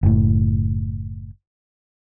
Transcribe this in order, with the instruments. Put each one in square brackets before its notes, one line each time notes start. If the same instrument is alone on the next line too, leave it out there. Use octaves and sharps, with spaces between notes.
[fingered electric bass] F#1 A2